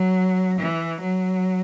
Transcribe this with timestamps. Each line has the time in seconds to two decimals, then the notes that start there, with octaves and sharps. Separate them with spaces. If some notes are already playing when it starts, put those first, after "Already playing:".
Already playing: F#3
0.59 E3
1.01 F#3